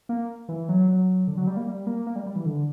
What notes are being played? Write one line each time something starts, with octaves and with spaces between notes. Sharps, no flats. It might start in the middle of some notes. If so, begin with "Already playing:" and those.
A#3
E3
F#3
F#3
D3
F#3
G3
A#3
G3
A#3
A#3
G3
G3
E3
D3